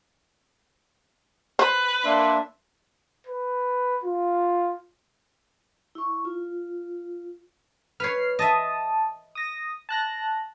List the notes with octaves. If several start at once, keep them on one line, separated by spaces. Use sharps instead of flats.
B4 C5
A#3 D4 D5 E5 C6
B4
F4
E4 C#6
F4
B4 C#5 F6 C7
D#5 E5 A5 D#6
D#6 A#6
A5 F#6 A#6